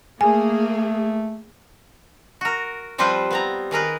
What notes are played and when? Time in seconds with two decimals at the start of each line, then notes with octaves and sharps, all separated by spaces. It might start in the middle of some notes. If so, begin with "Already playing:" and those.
0.21 A3 A#3 G#4 G#5
2.41 F#4 A#4
2.98 F3 G3 C4 F4 B4 C5
3.31 B3 C4 A#5
3.71 D#3 G#4 A#4 B4